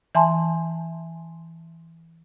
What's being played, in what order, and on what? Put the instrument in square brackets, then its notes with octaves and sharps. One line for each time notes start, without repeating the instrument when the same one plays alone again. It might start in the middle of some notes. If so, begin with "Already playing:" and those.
[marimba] E3 E5 G#5 A5 C6